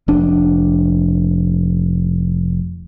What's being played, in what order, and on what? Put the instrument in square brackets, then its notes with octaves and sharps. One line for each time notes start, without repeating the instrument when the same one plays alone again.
[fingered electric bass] F1 D4